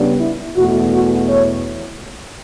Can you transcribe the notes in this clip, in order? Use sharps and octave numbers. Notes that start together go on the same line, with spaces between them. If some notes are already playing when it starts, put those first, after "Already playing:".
Already playing: C#3 G3 B3 D4
E4
E2 B2 A3 F#4
F#4
C#5